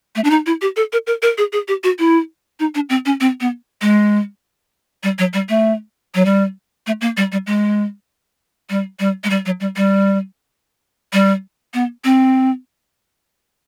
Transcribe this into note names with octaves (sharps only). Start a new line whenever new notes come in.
A3
D4
D#4
E4
G4
A4
A#4
A#4
A#4
G#4
G#4
G4
F#4
E4
D#4
D4
C4
C#4
C4
B3
G#3
G3
F#3
G3
A3
F#3
G3
A3
A#3
G3
G3
G#3
G3
G3
G#3
G3
F#3
G3
G3
G3
B3
C4